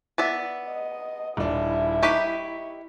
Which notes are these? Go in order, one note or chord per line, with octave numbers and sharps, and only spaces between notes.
B3 D5 E5
D#5
D#1 D4 E4
D#4 G4 B4 C#6 B6